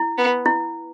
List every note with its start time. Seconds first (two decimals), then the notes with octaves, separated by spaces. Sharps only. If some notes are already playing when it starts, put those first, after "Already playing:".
Already playing: E4
0.18 B3
0.46 E4